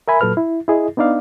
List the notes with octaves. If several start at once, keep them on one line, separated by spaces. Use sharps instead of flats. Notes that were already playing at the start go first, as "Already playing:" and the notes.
A#4 E5 G#5 B5
A#2 F#3 A4 B4 F6
E4
E4 G#4 D#5
B3 D4 D#4 D5 F5